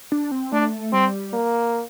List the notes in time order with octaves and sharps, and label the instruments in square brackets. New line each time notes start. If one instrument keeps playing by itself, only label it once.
[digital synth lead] D4
C4
[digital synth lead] A3 [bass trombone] D4
[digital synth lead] G3 [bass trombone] C4
[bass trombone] A#3